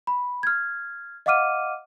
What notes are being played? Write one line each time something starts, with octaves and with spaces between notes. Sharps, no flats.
B5
F6 G#6
D#5 F5 F#5 D6 F6 D#7